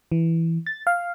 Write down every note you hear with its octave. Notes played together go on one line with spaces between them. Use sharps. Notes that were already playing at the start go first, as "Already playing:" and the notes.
E3
A6
F5